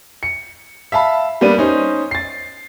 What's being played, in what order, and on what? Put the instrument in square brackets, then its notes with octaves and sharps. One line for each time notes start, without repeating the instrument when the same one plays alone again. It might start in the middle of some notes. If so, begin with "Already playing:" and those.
[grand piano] C#7
E5 F5 A5 B5
G3 A#3 B3 D4 D#7
C#4 D#4 C5
A6 C7